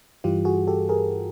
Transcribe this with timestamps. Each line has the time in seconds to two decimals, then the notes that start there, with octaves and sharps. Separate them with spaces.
0.24 G2 E3 G3 F4 G4
0.45 F#4 G#4
0.67 G4 A4
0.89 G#4 A#4